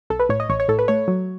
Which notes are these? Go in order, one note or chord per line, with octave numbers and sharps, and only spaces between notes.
B1 A4
B4
A2 C#5
D#5
A1 C#5
C#5
A2 A4
B4
A3 C#5
F#3